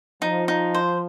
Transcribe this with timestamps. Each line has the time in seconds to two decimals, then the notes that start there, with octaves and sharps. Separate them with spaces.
0.22 F3 D#4
0.48 D#4
0.74 C5